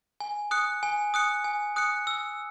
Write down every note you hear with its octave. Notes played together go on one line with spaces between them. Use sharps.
G#5
D#6 F#6 C#7
G#5
D#6 F#6 C#7
G#5
D#6 F#6 C#7
E6